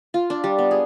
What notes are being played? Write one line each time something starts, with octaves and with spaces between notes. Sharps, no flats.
F4
D4
G3
B3
G#4